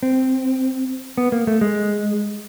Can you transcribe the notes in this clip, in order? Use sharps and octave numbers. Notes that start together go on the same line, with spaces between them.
C4
B3
A#3
A3
G#3